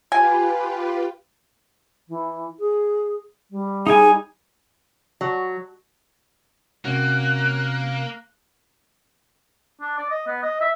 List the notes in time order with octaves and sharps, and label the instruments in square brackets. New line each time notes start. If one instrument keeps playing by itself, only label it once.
[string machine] F4 G4 B4 [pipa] G#5
[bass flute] E3
G#4
G3
[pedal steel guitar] D#4 G#5 [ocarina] G#4
[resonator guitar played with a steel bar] F#3
[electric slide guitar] C3 C#4 F#4 [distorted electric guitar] A#3 [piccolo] F#6
[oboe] D4
D5
D#5
B3
D#5
E5